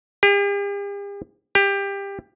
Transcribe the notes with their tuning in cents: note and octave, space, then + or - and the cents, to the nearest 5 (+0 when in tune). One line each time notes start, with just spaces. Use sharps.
G4 +45
G4 +20